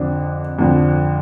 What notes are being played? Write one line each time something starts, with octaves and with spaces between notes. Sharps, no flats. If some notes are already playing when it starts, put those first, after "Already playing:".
Already playing: F2 D3 F3 D4
F2 D3 F3